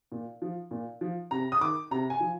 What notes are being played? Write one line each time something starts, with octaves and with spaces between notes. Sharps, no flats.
A#2
F3
A#2
F3
C3 A#5
D#6
D#3 D6
C3 A#5
G#5
F3